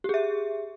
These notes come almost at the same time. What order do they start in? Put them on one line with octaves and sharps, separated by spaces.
G4 G#4 E5